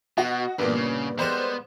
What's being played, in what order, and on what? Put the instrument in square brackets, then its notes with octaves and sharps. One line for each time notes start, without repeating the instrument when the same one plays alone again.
[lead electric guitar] B2 [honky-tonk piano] F#4 [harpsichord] D#5
[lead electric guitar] E2 [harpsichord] G2 A#2 [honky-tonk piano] B3
[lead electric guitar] C#3
[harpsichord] G3 G#3 A#4 [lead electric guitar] B3 [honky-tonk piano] C5 E7